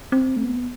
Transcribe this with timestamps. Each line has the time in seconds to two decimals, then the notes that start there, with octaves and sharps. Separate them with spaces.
0.12 C4
0.36 A3
0.45 B3